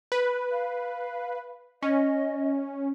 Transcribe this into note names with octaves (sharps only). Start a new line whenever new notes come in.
B4
F5
C#4 D#5